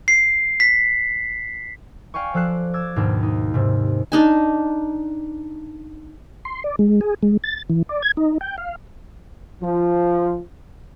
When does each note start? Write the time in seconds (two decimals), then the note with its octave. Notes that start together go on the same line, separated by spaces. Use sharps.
0.08 C7
0.60 B6
2.14 D5 F5 G5 G#5 C#6
2.34 F3 A4 D5 F#6 C7
2.74 D6 E6 G#6 A6
2.96 D#2 G#2 B2 D4
3.23 D#4
3.54 G#2 C3
4.12 D4 D#4 G#5
6.45 C6
6.64 D5
6.79 G#3
7.01 G#4
7.23 G#3
7.44 A6
7.70 E3
7.89 D5
8.02 G#6
8.17 D#4
8.41 G5
8.58 F5
9.61 F3